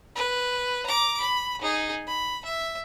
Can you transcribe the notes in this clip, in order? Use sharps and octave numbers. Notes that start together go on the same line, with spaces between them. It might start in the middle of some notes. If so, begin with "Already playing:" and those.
B4
A#5 D6
B5
D#4 G#4
B5
E5